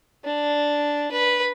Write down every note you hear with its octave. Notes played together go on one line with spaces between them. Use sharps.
D4
B4